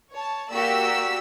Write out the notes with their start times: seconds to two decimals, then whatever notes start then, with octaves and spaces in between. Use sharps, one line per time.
0.11 C#5 A5
0.52 A#3 F#4 G4 D5 E6 B6